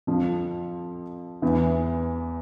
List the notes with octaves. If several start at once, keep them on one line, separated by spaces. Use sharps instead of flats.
F2 F3
E2 E3